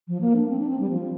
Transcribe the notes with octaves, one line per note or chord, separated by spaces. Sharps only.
F3
A#3
D4
C4
D4
C4
G3
F3